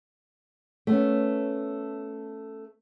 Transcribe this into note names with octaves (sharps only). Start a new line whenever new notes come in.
A3 B3 C#4